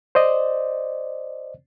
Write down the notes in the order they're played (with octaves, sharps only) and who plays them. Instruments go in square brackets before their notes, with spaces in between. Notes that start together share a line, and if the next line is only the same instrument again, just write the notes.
[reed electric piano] C5 D5 D#5